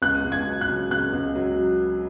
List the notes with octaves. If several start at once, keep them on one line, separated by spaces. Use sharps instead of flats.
C#2 F#6
C#2
G#6
F#3
F#6
C#3
C#2 F#6
C#2
F#3